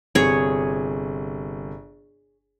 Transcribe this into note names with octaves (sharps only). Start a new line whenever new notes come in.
G1 C3 G#4 C#5